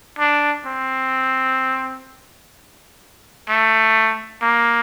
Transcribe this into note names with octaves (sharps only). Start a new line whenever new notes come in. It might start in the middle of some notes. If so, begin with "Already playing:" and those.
D4
C4
A3
A#3